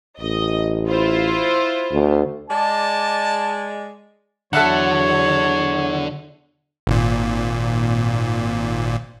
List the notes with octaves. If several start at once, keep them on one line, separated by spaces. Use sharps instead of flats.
A1 D#5
E4 F4 C5
D2
G#3 D5 A5
E2 D3 F#3 A4 C#5 E5 F#5
G#1 A#2